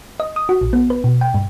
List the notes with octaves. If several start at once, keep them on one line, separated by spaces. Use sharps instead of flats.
D#5
D#6
F#4
A#1
B3
B4
B2
G5
G2